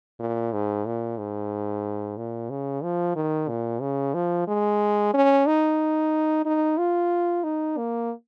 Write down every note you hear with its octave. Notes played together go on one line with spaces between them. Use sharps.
A#2
G#2
A#2
G#2
A#2
C#3
F3
D#3
A#2
C#3
F3
G#3
C#4
D#4
D#4
F4
D#4
A#3